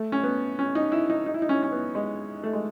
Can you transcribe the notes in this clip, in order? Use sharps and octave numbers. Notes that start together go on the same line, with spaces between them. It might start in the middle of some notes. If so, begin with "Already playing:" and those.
Already playing: A3
C#4
B3
C#4
D#4
E4
D#4
D#4
E4
D#4
C#4
C#4
B3
G#3
A3
G#3